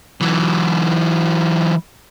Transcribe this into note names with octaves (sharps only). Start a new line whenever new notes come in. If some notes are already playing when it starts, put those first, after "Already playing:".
E3 F#3